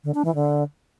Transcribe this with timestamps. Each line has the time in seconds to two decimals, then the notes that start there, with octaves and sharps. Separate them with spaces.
0.04 D3
0.14 D4
0.25 E3
0.35 D3